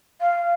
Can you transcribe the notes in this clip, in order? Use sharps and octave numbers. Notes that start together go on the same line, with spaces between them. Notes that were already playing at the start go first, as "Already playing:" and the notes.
F5